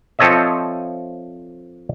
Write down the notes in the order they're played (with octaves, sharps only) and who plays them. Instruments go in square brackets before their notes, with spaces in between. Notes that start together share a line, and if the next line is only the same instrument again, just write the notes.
[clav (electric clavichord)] F3 C4 A4 C#5 D#5 E5